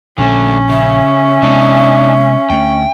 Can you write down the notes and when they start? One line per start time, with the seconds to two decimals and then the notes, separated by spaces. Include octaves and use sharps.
0.18 A#1 D3 A3 C#4
0.69 C#3 E5
1.42 C3 G#3 B3 D4 D#4
2.50 D2 A3 G5